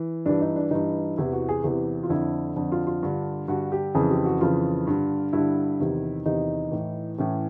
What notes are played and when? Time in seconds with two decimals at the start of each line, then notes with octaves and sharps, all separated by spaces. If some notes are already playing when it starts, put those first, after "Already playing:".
Already playing: E3
0.26 G2 E3 D4
0.41 D#4
0.56 D4
0.71 G2 E3 D#4
1.18 E2 C3 E3 E4
1.33 F#4
1.49 G#4
1.64 E2 C3 E3
2.03 F4
2.09 F2 D3 E4
2.56 F2 D3
2.72 F4
2.87 F4
3.03 G2 D3
3.48 G2 D3 F#4
3.72 G4
3.95 F2 C#3 E3 G#4
4.10 G4
4.25 F#4
4.41 F2 C#3 E3 F4
4.87 G2 D3
5.33 G2 D3 E4
5.80 E2 C3 D#3
6.26 E2 C3 D#3 D#4
6.72 A2 E3
7.18 A2 E3 C#4